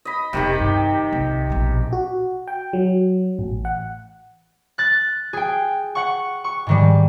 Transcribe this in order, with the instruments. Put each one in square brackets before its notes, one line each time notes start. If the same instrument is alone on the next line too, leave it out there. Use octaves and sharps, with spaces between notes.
[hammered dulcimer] D#5 B5
[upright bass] E1 E2 [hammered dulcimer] C3 D#3 G4
[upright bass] G2 E3
C2 F2
A#1 B2
[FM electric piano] F#4
G5
F#3
A1
F#5
[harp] F#6 A6
G#4 G5
F#5 C#6
C#6
G#2 D#3 G3